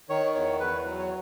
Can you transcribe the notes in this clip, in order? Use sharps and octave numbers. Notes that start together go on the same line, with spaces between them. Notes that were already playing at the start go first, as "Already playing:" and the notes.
D#3 C#5
E2 C#5
E2 B4
F#3
C#5